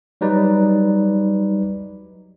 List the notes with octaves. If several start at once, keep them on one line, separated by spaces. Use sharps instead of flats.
F#3 G3 D#4 B4 D5